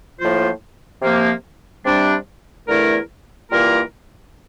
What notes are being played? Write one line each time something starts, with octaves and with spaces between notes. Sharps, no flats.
A2 F3 A#3 F4 C5
C3 F3 A#3
C3 G3 D4
E2 D3 A3 E4 A#4
E3 G3 A#3 F4 A#4